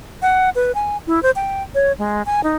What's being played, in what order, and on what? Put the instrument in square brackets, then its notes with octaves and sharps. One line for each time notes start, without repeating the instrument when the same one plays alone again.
[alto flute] F#5
B4
G#5
E4
C5
G5
C#5
G#3
G#5
D#4